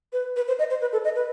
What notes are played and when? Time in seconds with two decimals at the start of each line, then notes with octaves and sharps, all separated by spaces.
0.13 B4
0.36 B4
0.48 C5
0.59 D#5
0.70 C5
0.81 B4
0.93 A4
1.04 D#5
1.16 B4